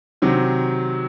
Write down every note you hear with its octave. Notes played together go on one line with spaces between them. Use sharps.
C3 D#3 F#3